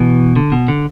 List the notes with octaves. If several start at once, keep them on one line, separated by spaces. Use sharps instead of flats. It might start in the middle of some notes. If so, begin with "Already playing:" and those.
Already playing: B2 E3
D3
B2
D3